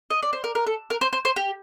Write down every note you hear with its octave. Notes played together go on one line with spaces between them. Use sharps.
D#5
D5
C5
A#4
A#4
A4
A#4
C5
C5
C5
G4